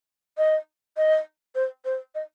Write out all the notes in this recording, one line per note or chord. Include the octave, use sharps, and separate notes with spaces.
D#5
D#5
C5
C5
D#5